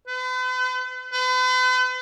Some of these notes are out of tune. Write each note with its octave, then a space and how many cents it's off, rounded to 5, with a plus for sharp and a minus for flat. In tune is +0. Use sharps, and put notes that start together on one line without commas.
B4 +45
B4 +45